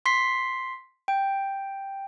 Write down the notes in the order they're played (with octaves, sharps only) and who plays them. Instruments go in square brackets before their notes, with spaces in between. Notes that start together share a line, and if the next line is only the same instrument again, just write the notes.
[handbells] C6 B6 C7
G5